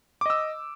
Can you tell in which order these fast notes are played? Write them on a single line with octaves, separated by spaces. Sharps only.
D6 D#5 E6